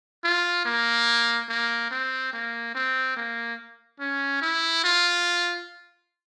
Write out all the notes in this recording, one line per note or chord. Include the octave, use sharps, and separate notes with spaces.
F4
A#3
A#3
C4
A#3
C4
A#3
C#4
E4
F4